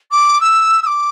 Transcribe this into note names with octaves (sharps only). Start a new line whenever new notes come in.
D6
E6
E6
D6